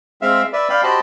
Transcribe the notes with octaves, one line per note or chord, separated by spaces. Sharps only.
G#3 C4 E5 F5
B4 D5 E5
D5 F5 G5 B5
F#4 G4 C5 D#5 A5 B5